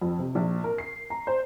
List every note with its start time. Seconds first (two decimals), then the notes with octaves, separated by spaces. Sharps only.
0.01 F2
0.19 C3
0.35 A#1
0.64 A#4
0.78 C7
1.10 A#5
1.27 C5